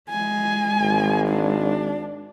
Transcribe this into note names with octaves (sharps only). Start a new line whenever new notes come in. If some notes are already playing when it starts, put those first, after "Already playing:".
G#3 G#5
G#1
D4